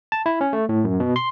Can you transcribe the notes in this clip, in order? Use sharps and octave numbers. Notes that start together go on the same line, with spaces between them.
A5
E4
C#4
A3
A2
F#2
B2
C6